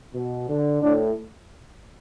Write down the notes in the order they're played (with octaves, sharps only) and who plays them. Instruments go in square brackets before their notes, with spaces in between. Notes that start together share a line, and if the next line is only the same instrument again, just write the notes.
[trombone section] B2
D3
[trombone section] A2 [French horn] D4